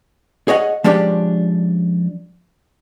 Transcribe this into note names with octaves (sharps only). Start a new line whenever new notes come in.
G#4 C#5 D#5 F#5
F3 G#3 C#4 D4 G4 D5